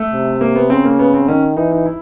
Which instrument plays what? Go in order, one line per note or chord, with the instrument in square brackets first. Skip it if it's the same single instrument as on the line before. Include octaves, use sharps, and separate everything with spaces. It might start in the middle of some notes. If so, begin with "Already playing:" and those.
Already playing: [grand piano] A3
[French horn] C3
[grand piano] A#3
B3
[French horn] C#3 [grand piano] C4
[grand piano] A#3
B3
C4
[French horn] D#3 [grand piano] C#4
[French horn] E3 [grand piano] D#4
[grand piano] D#4
E4